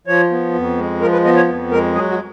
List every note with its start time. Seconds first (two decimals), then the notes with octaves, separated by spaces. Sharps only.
0.07 F3 C#5
0.31 B3
0.54 F2
0.78 G#3
1.01 F3 A#4
1.13 B4
1.25 B3 D#5
1.36 C#5
1.48 F2
1.71 G#3 A#4
1.95 F#3 G#4
2.10 F#4